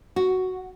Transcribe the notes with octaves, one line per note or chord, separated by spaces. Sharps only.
F#4